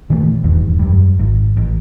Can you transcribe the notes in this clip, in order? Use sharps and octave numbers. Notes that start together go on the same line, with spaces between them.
A#2 D#3 E3 A3
D#1 E2 G2 D#3
F#2 G3
G#1
A1